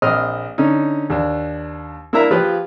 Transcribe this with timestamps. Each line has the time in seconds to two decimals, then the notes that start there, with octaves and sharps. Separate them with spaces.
0.02 A#1 C4 D#5 D#6 F6
0.58 D3 C#4 D#4
1.10 D#2 D4
2.13 A#3 D4 E4 A#4 E5 A#5
2.31 F3 F4 G4 G#4 B4